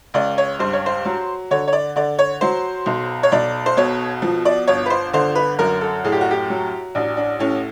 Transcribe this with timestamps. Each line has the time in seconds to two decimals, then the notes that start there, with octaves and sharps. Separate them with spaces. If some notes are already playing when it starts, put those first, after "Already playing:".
0.14 C#2 D5
0.38 C#5
0.59 G2 C5
0.73 C#5
0.86 C5
1.05 F#3
1.51 D3 C#5
1.68 C#5
1.73 D5
1.96 D3 D5
2.19 C#5
2.41 F#3 C5
2.86 B1
3.23 C#5
3.32 B1 D5
3.66 C5
3.77 B2 C#5
4.22 F3
4.45 D5
4.67 G1 C#5
4.86 B4
4.90 C5
5.13 D3 C5
5.35 B4
5.59 F#2 A#4
5.81 A4
6.04 A2 G#4
6.12 G4
6.21 F#4
6.31 G4
6.49 F#3
6.95 A1 D4
7.17 D4
7.39 A2 C#4